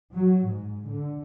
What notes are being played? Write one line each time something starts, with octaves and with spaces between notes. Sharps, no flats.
F#3
G#2
D3